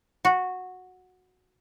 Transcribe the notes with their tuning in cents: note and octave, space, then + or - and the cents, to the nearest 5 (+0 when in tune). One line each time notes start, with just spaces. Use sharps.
F#4 -10